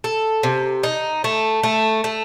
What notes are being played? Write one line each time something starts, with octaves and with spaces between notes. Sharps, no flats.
A4
C3
D#4
A3
A3
A3